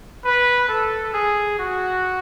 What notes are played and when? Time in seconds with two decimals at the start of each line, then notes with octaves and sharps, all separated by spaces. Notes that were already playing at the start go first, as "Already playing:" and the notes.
0.25 B4
0.69 A4
1.14 G#4
1.59 F#4